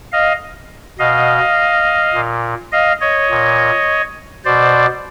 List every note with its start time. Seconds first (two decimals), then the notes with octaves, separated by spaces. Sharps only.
0.12 D#5 F5
0.99 B2 D#5 F5
2.14 A#2
2.72 D#5 F5
3.01 C#5 D#5
3.30 A#2
4.45 B2 C5 D5